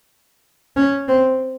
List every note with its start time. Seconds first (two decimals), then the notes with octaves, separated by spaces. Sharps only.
0.76 C#4
1.08 C4